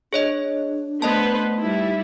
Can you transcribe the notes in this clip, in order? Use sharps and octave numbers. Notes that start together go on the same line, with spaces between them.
D4 G#4 C#5 D#5
A3 B3 B4 C5 D#5 A5
G3 D#4 E4